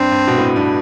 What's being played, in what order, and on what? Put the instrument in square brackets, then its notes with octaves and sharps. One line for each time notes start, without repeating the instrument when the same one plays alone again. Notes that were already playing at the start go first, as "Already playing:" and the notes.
Already playing: [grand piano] G2 [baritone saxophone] C4
[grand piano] G2
B2
A2
G2